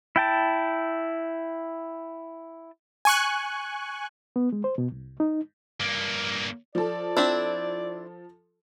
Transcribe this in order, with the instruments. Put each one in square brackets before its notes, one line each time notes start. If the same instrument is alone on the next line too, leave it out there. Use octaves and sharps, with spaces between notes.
[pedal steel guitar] E4 G5 A5
[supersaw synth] G#5 C#6 F#6
[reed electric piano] B3
G#3
C5
B2
C2
D#4
[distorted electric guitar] G2 A#3
[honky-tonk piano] F3 A4 [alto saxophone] D5
[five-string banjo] C4 D4 E4